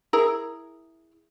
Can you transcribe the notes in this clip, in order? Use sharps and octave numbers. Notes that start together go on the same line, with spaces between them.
E4 G#4 A#4